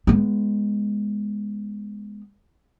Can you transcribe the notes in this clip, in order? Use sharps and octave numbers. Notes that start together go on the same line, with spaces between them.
G#3 B3